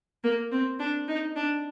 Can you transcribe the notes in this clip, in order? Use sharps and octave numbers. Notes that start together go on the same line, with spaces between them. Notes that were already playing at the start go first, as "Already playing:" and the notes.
A#3
C4
D4
D#4
D4